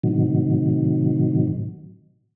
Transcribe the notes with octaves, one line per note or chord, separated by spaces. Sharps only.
A2 C3 D#3 F#3